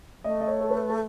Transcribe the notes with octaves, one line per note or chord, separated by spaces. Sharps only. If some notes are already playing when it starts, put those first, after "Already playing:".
A3 D#5
D#5
C#5
A4
B4
A4